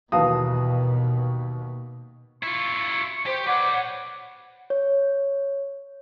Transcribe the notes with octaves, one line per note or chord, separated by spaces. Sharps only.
D#2 B2 E3 F#4 F5 A5 D#6
E4 F4 C#6
G4 C5
B4 C#5 D5 F#5
C#5